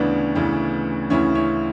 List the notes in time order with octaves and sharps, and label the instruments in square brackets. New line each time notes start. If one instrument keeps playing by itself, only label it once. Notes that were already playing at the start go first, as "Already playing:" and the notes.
Already playing: [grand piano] D2 C#3 E3 B3 C#4 D4
D2 C#3 E3
D2 C#3 E3 C#4 E4
C#4 E4